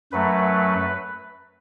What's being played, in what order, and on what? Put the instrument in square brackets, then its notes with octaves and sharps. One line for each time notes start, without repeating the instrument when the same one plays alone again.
[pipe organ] F#2 F#3 A3 B4